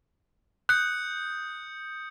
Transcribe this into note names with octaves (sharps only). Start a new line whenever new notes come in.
D#6 F#6 G6 C#7